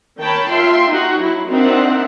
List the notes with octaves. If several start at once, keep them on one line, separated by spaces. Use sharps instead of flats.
D#3 C#5 G5 A5 B5
F4 E5 G5 C6
D#4 F#4
F#3 E4
C4 D4 D#4 A#4 E5 F#5